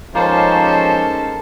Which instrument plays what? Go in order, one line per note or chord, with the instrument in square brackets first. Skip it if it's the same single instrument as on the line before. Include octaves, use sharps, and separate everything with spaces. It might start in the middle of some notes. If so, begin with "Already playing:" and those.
[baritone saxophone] F3 [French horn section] G#3 C#4 D#4 [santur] A#3 [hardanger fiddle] A4 C5